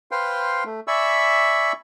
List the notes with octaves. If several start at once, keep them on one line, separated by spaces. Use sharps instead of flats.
B4 C5 F5 G5 C6
A3
D5 E5 G#5 B5 C#6 E6